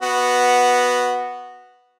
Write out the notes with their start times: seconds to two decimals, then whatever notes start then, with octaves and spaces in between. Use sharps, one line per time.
0.02 B3 F#4